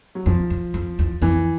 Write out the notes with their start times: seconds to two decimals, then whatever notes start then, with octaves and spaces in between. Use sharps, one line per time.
0.15 F#3
0.26 F2 F3
0.50 F2
0.74 F2
0.99 E2
1.22 F2 E3